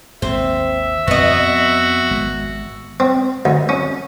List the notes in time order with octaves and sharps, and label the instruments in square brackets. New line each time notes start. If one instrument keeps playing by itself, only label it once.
[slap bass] G#1 D#2 [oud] C4 [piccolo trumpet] E5
[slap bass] F2 C4 [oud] B3 D#5 [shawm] F#4
[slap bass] G#1 G#3
[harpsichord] C4
D2
C#4